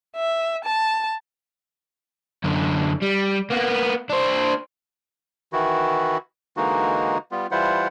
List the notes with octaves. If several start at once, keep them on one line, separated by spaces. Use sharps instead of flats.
E5
A5
F#2 D3
G3
A#3 B3
D4 C5
D#3 E3 E4 F#4
D3 E3 G#3 A#3 D#4 F#4
G3 B3 F4
E3 G3 E4 F4 C5 F#5